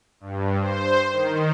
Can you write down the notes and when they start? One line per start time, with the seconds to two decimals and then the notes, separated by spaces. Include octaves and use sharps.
0.20 G2
0.60 C5
1.12 D#3